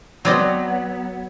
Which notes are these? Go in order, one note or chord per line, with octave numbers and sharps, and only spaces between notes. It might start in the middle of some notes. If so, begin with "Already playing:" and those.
F#3 B3 C4 D5 D#5